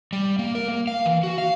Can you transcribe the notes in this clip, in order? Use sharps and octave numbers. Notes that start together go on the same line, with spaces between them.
G3
A#3
A#4
A#3
F5
E3
F#4
F5